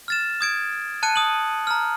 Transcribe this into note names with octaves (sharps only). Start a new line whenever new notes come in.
F6 A6 E7
D#6 G#6 D7
A5 F#6 C#7 D#7
D#6 F#7
A#5 F6